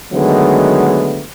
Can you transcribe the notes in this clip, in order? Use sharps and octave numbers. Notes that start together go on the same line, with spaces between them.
D3 D#3 F#3 G#3 A3 B3